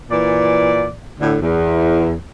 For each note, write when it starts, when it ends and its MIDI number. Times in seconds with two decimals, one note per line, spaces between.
0.10 0.89 46
0.10 0.89 52
0.10 0.89 74
1.20 1.36 38
1.20 1.36 45
1.20 1.36 50
1.41 2.14 40